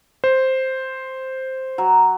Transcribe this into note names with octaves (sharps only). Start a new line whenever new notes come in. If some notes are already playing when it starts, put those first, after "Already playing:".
C5
F#3